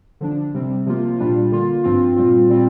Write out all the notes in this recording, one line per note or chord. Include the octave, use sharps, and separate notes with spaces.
D3 F3 D4
C3 G3 C4
C3 F3 A#3 F4
A#2 G3 D4 F4
D3 A#3 F4
G2 F3 C4 F4
A#2 G3 C4 F4
A#2 G3 C4 F4